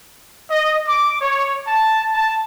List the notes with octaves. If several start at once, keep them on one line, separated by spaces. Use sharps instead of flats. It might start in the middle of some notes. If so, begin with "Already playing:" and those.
D#5
D6
C#5
A5
A5